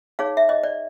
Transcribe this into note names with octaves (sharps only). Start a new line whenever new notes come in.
D#4 G#4 C#5 F5
E5
D#5
D5